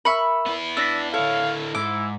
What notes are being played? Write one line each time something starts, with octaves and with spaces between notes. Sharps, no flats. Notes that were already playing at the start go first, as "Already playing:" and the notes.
A#4 E5 B5 C#6 E6
B3 E4
D4 E6 A#6 B6
D3 E4 A4 C#5 F5
G#2 E4 D6